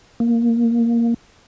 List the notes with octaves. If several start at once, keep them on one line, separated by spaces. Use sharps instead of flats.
A#3